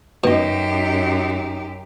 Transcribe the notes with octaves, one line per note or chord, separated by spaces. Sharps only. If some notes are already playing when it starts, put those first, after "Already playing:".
F#2 B2 D#4 G4 D#5